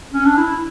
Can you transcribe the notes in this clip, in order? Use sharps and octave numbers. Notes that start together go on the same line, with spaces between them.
C#4
D4
E4